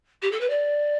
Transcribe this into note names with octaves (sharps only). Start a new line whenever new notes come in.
G4
A4
B4
D5